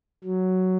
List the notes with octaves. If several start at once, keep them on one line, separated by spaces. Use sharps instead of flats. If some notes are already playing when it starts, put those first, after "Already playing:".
F#3